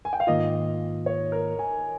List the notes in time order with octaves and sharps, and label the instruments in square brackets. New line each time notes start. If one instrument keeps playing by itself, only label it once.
[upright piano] G#5
G5
F5
[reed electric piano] G#2 D#3 A#3 F4 [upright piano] D#5
[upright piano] C#5
A#4
G#5